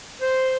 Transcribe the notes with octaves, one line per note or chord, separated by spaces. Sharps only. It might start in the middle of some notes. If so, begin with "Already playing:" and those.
C5